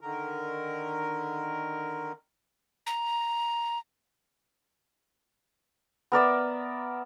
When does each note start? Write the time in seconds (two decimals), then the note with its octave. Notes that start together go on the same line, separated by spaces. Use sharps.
0.01 D3 D#3 A#4
2.87 A#5
6.12 B3 A#4 D5 E5